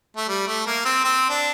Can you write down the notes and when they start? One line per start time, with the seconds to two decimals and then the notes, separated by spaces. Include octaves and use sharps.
0.17 A3
0.28 G3
0.48 A3
0.67 A#3
0.85 C4
1.04 C4
1.29 D4